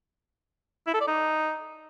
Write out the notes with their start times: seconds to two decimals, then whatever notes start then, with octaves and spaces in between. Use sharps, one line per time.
0.87 E4
0.94 A4
1.01 D5
1.08 D#4